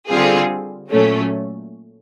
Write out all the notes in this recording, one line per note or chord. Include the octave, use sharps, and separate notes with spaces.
D3 G3 C4 F4 G#4
A#2 F#3 A3 C#4